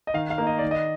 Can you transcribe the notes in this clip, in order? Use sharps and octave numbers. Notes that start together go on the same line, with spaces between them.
D#5
D#3 F5
F5
A#3 D#4
D#5
D#3 D5
D#5